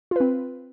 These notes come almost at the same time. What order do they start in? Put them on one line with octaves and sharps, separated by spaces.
F4 B4 C4